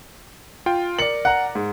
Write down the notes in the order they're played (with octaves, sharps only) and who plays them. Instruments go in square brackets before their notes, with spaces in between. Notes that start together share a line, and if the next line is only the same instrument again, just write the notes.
[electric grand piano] F4 G5
[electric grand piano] A#4 D5 [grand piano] C#7 F#7
[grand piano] F#5 A#5
G#2